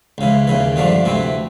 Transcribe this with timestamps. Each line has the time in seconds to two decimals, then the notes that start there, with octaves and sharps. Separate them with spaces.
0.18 C#2 C#3 E3
0.47 D#2 C#3 E3
0.76 G2 D3 F3 A3 D4
1.05 D2 C3 E3 A3 C4